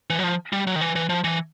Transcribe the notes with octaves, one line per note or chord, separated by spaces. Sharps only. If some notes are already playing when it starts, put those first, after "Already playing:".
E3
F#3
F3
G3
F#3
D#3
E3
E3
F3
E3